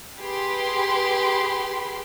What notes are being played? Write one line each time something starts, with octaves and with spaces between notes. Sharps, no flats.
G4 G#4 B4 B5 C6